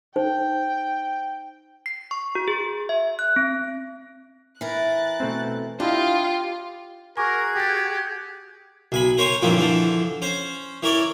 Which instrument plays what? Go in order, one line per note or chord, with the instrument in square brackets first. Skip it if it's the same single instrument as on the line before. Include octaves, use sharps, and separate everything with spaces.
[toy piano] D#4 C5 [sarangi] G5
[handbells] C7
C#6
F#4
G#4
E5
F#6
C4
[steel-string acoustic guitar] E3 A#4 [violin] F#6 A6
[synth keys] B2 A3 C4
[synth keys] D4 E4 D#5 [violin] F4 F5 [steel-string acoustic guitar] G4
[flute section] F#4 G#4 G#6 [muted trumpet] A#4 [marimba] G#5 C#6 D6
[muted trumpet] G4 [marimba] G5 A6
[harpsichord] B1 G#5 B5
A#4 C5 C#5 G#5 C6 C#6
G2 A#2 E3 F3 C4
D3 E3 F3
C#4 C5
E3 A#4 C#5 D5